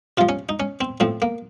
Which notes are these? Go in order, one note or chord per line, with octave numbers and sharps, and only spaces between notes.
C3 F3 F4
C#4
D#4
C#4
C4
A2 F3 C4
A#3